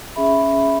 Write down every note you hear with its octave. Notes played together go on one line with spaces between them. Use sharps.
C#4 G#4 E5 B5